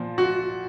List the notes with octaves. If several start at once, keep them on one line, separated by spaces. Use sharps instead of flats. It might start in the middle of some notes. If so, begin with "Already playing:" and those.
Already playing: A#2 F3
F#4